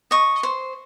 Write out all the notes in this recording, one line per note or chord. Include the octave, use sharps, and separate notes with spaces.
D#5 C#6
C5